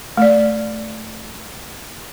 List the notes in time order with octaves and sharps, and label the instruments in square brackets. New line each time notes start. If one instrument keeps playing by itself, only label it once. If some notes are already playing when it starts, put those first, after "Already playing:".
[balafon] A3 D5